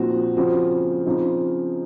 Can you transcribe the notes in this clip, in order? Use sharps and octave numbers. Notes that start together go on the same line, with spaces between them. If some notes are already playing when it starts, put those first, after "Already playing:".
Already playing: A#2 F3 C4 D#4 F#4
C#3 F3 C4 F#4
C#3 F3 C4 D#4